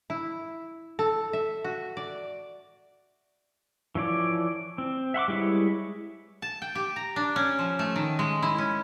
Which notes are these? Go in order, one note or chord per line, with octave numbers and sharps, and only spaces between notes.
E4
A4
E5
F#4
D5
E3 F3 C#5 D5
C4
E5 F#5 C6 D6
G3 G#3 E4 B4 C#5
A5
G5
G4
A#5
D4
C#4
F3
A3
D#3
G#3
E4
C#4